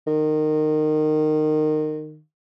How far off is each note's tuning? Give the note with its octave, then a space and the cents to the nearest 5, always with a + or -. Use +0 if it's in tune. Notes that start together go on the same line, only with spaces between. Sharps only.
D#3 -20